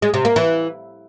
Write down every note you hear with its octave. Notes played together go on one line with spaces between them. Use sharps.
G#3
C3
A#3
E3